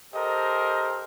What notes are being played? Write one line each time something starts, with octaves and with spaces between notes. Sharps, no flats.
G4 A4 A#4 C5 D#5